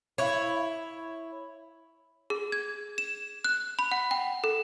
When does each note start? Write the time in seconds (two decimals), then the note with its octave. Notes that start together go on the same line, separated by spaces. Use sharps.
0.18 E4 C#5
2.30 G#4
2.52 G#6
2.98 E7
3.44 F#6
3.79 B5
3.91 F#5
4.11 G5
4.44 A4